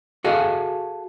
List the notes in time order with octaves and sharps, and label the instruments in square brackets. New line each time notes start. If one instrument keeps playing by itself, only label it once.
[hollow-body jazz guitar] F#4 G#4 A4 D#5 F5